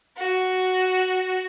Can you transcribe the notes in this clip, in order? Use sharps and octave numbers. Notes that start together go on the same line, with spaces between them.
F#4